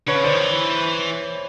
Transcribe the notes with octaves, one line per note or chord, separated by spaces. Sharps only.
D3 B4 C#5
C#3
D3 C5 D5
D#3
E3